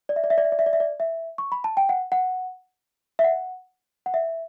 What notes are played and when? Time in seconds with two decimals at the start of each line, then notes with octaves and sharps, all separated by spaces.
0.09 D5
0.16 E5
0.24 D5
0.30 E5
0.38 D5
0.45 E5
0.52 D5
0.59 E5
0.66 D5
0.73 E5
0.80 D5
1.00 E5
1.38 C#6
1.52 B5
1.64 A5
1.77 G5
1.89 F#5
2.12 F#5
3.19 E5
3.24 F#5
4.06 F#5
4.14 E5